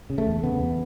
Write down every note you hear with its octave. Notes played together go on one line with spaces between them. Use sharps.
C#3
A3
E2
C#3 B3
E2